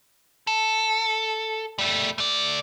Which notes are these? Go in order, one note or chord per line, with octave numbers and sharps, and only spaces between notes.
A4
G3 A3
A3 D5